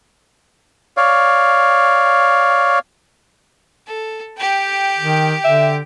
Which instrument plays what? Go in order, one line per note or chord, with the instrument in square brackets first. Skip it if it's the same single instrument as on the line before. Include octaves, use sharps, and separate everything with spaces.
[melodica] C#5 D5 F5
[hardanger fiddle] A4
G4 G5
[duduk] D#3
[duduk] D3 [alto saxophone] E5